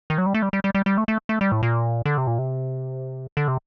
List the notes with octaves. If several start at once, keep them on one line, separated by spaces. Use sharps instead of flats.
D#3
F#3
G3
A3
G3
G3
G3
G3
G3
A3
A3
A3
G3
A2
A#2
D3
C3
A#2
C3
D3
C3